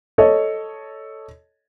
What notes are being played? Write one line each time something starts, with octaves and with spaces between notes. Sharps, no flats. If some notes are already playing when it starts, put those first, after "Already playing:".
A4 C#5 D#5